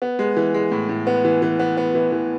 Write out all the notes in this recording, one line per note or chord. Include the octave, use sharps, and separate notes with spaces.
B3
G#3
E3
G#3
A2
A2
B3
E3
E3
B3
B3
E3
E3